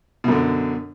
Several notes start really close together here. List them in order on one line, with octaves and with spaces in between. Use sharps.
B2 F#2 D3